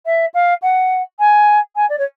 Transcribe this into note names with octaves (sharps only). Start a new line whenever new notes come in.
E5
F5
F#5
G#5
G#5
D5
C#5